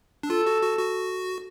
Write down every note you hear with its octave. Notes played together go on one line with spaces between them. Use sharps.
D4
F4 A4
F#4
F#4
F#4